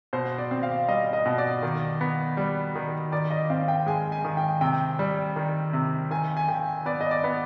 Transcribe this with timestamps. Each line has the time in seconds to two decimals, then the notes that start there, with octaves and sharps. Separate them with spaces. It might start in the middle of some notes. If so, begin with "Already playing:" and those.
0.13 B2 C5
0.38 D5
0.51 C4
0.63 F5
0.88 G3 D#5
1.13 D#5
1.26 B2
1.38 D5
1.63 D#3
2.01 B3
2.37 G3
2.75 D#3
3.12 D#3 D5
3.31 D#5
3.50 C4 F5
3.68 G5
3.86 G#3 G#5
4.12 G#5
4.25 D#3
4.37 G5
4.61 C3 G5
4.99 G3
5.36 D#3
5.73 C3
6.11 D#3 G#5
6.37 G#5
6.48 D#3 G5
6.86 B3 D5
7.01 D#5
7.11 D5
7.24 B3